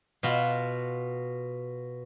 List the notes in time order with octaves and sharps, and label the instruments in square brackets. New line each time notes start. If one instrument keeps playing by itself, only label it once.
[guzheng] B2 F4 F#4